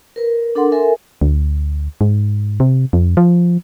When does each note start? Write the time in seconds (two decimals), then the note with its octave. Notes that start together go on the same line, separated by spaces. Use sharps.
0.16 A#4 B4
0.55 D4 A4 A#4 F#5 C6
0.72 A4 A#4 E5 G#5
1.21 D2
2.01 G#2
2.60 C3
2.93 F2
3.17 F3